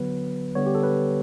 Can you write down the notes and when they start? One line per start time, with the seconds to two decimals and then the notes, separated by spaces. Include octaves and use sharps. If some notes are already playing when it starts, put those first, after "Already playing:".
Already playing: D3 F#3 B3 B4
0.55 D3 G3 B3 C#5
0.66 G4
0.75 A4
0.83 B4